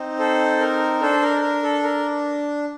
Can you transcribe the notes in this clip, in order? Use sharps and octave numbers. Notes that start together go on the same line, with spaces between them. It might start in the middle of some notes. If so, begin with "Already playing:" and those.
Already playing: C4 D#4
A4 C5
A#4
D4 A4 C5
A#4
A#4
A4
A#4